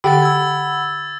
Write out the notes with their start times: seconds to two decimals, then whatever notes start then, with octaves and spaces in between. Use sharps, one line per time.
0.04 D3 G4 F#5 G5 B5 E6 A6
0.22 E6 G#6